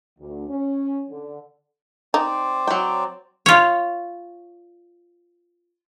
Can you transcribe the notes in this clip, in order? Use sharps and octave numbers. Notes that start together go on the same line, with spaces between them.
D2
C#4
D3
C4 D#4 C5 D5
F#3 G5
F4 C#5